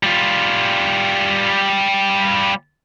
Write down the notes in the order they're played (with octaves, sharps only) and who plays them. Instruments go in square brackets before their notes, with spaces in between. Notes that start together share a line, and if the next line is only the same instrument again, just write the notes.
[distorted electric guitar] G3 F4